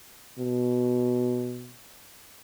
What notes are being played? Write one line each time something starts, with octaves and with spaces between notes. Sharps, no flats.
B2